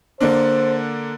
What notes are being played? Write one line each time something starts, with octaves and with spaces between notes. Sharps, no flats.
D3 A#3 D4 C5